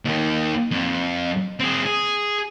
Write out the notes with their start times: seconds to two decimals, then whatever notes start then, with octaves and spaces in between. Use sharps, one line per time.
0.05 D#2 D#3
0.71 F2
1.60 C4 G#4
1.86 G#4